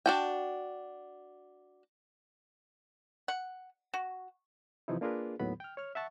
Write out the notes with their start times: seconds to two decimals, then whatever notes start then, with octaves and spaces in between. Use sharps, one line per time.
0.06 D4 F#4 G5
3.28 F#5
3.94 F#4
4.88 C3 E3 F3 D#4 E4
5.01 A#3 D4 F4 G#4 A#4 B4
5.40 D#2 A2 D#3 F#3 B3 B5
5.60 G5 F6
5.77 C#5 F6
5.95 E5 F#5 A5 C#6